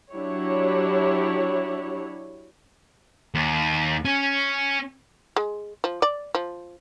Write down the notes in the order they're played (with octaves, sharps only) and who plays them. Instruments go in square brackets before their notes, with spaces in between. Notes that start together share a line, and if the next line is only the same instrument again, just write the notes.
[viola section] F#3 D4 E4 G4 C#5
[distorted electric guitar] D#2
C#4
[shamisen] G#3
F3
D5
F3